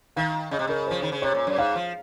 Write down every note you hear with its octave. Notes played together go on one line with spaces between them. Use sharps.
D#3 F5
C#3 D#5
C3
C#3 A#4
F3 C5
D#3
C#3
C3 C#5
A#2
F#2
G#2 F5
F3